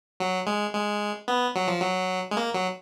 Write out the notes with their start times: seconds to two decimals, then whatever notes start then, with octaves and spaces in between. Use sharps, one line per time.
0.20 F#3
0.47 G#3
0.73 G#3
1.28 B3
1.55 F#3
1.68 F3
1.80 F#3
2.31 G#3
2.37 A#3
2.54 F#3